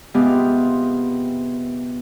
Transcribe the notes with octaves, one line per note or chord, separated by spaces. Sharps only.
C3 G#3 B3 F4 G4 F5